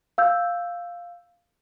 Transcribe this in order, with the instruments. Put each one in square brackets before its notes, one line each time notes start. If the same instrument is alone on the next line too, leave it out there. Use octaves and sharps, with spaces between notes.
[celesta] F5 E6 G6